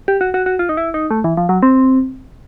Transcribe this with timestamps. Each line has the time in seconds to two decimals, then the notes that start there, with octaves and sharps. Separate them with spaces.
0.08 G4
0.21 F#4
0.34 F#4
0.46 F#4
0.59 F4
0.69 D#4
0.77 E4
0.94 D#4
1.11 A3
1.24 E3
1.37 F3
1.49 F#3
1.63 C4